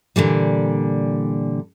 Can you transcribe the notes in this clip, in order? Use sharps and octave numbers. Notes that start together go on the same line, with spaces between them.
A#2 D3 E3 G3